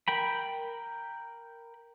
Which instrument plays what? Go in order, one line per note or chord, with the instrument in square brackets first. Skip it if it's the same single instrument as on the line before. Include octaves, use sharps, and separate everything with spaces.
[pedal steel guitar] A#4 G5 B5